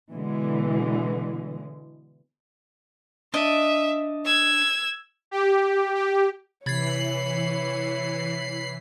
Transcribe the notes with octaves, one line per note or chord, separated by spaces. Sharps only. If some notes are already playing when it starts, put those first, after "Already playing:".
B2 D3 E3 G#3
D4 D#5 E5
E6 G#6
G4
G4
C3 E3 C#5 B5 G#6 A6 C7